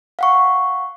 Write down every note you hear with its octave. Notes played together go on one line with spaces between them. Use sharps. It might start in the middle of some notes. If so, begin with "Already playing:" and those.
F5 F#5 C#6